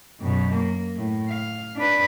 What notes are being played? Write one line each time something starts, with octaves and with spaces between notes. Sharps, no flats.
F#2 B2
A#3
A2
F5
D4 B4